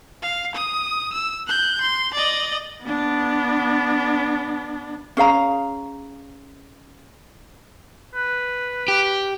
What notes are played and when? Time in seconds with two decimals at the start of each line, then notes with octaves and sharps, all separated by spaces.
0.22 F5
0.55 D#6
1.13 E6
1.47 F#6 G6
1.81 C6
2.14 D5 D#5
2.85 B3 D4
5.17 C#4 G#4 F5 A#5
8.15 B4
8.88 G4